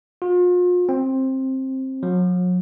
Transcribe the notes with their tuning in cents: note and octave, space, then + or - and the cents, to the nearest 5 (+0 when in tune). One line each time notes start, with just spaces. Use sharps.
F4 +40
C4 +15
F#3 -40